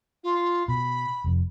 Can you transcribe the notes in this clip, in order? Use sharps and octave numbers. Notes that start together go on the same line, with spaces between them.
F4
B2 B5
F1 F2